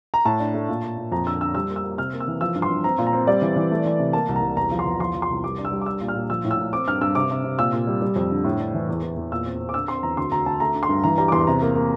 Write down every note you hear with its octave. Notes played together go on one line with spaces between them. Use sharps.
A#5
A2 A5
D4
A3
A#2
A#2
A#2
F2 A#5
D3 E6
D3 E6
G3 E6
A#3
E6
A#3
C3 F6
A#3
E6
E3
F3 E6
G2
C6
G2
C4 A#5
A#2
A#5
C4
G3 D5
E3
E3
A3
E3
C3
A#3 A5
C2
A#5
C2
E2 A#5
F3
C6
E2
F3 C6
F3
C6
C2
G3 D6
D4
E6
G3
D6
D4 E6
A#2
F6
A#2
F3 E6
A2
E6
A2
C4 D6
G2 F6
G2 E6
C3 D6
C3
C3
A#2 E6
A#2
G3
G3
F2
D3
A2
D4
E3
E2
E2
E2
A#2 E6
C4
C4
D6
D3 E6
C4 C6
E2 A#5
D2 C6
D2 A#5
D2 A5
A3 A#5
D3
C6
G2
E3 A#5
G3 A#5
D6
E2 C6
C3 A#5
A#3
A#3